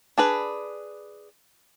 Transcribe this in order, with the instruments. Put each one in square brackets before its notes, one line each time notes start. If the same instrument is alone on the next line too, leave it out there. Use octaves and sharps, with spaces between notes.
[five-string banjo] D4 G#4 B4